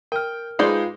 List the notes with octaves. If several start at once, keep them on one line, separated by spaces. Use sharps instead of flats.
A#4 G5 F6
G#3 D#4 F4 B4 C5 D5 G5